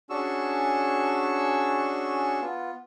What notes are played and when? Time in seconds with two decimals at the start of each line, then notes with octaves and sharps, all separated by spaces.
0.10 C#4 D4 F#4 G#4 C#6 E6
2.41 B3 F4